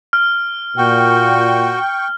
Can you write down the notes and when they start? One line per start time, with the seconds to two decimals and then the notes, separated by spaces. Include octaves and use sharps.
0.13 F6
0.77 A#2 F#4 G5 C#6